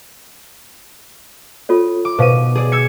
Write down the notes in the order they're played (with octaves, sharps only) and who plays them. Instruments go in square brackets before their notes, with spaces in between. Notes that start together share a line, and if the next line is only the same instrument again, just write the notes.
[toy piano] F4 A4 C#5
[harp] D6
[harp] B2 D#7 [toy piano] B4 C5 F5
[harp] G#4 D5
E6 G#6 C#7